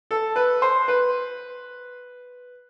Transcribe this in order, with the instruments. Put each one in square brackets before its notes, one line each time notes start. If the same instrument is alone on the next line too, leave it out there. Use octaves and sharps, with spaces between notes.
[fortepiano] A4
B4
C5
B4